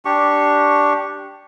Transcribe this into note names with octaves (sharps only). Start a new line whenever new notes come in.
D4 G4 C#6